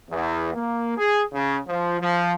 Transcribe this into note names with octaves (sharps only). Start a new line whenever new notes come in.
E2
A#3
G#4
C#3
F3
F3